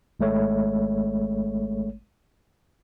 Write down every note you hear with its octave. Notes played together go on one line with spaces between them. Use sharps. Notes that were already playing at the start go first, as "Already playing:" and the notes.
G#1 G#3 A3 C#5